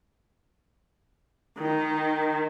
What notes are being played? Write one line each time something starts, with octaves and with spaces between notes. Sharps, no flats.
D#3